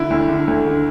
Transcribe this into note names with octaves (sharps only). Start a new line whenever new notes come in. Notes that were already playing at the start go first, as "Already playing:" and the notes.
Already playing: D3 E4
D2
D3
D2
D3